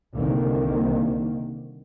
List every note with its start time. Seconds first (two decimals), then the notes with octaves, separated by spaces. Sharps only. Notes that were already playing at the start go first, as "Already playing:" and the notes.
0.12 C2 D3 D#3 A#3